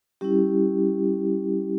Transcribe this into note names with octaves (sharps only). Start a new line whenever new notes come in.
G3 C#4 E4 G4